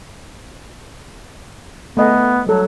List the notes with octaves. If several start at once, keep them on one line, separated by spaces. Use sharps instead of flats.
A3 B3 D#5 G#5
F#3 G3 A4